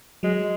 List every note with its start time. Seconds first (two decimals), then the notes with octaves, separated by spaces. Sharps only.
0.23 F#3 G#3